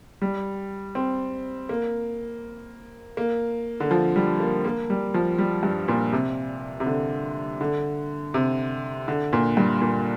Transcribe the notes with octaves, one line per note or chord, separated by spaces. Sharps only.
G3
C4
A#3
A#3
D3
F3
G3
A#3
A#3
G3
F3
G3
G2
A#2
C3
C3
D3
D3
C3
D3
A#2
G2
A#2